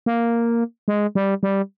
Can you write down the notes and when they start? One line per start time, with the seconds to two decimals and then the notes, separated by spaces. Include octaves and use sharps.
0.06 A#3
0.88 G#3
1.15 G3
1.43 G3